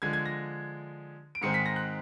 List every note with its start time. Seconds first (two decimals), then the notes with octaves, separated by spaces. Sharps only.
0.02 D3 F3 G#3 G#6
0.13 G#6
0.25 A#6
1.35 D7
1.41 G#2 D#3 G#3 C4 C#7
1.54 B6
1.66 A#6
1.76 F#6